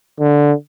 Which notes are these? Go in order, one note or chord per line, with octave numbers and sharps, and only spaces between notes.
D3